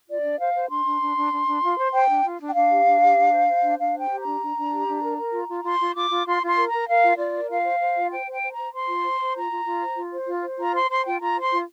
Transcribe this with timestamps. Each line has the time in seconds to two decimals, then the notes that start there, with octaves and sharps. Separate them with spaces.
0.08 F4 D5
0.23 D4
0.38 C5 F5
0.54 C5
0.69 D4 C6
0.85 D4
1.00 D4
1.16 D4
1.32 D4
1.47 D4
1.62 F4
1.78 C5
1.93 C5 G5
2.08 D4
2.24 F4
2.40 D4
2.49 G5
2.54 D4 F5
2.71 G4
2.86 D4
3.02 G4
3.16 D4
3.32 C5
3.48 C5
3.62 D4
3.79 D4 F5
3.93 C5
3.99 G5
4.09 G4
4.19 A#5
4.25 D4
4.41 D4
4.56 D4
4.72 G4
4.87 D4
5.02 A#4
5.17 A#4
5.32 F4
5.48 F4
5.64 F4 C6
5.80 F4
5.95 F4 D6
6.10 F4
6.26 F4 C6
6.42 F4 C6
6.56 A#4
6.67 A#5
6.73 A#4
6.88 A#4 F5
7.03 F4
7.18 F4 D5
7.34 A#4
7.49 F4 F5
7.64 C5
7.80 C5
7.96 F4
8.11 C5 G5
8.26 C5
8.32 G5
8.43 C5
8.52 A#5
8.58 C5
8.72 C5 C6
8.88 F4
9.04 C5
9.20 C5
9.35 F4 A#5
9.51 F4
9.65 F4
9.81 C5
9.97 F4
10.12 C5
10.27 F4
10.43 C5
10.58 F4 A#5
10.73 C5 C6
10.89 C5 C6
11.05 F4 G5
11.20 F4 A#5
11.36 C5 C6
11.52 F4